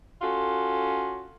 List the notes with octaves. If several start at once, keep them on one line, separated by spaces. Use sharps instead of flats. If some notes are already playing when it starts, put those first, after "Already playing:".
C#4 F4 F#4 A4